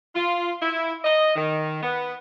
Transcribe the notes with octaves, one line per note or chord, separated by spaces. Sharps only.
F4
E4
D#5
D#3
B3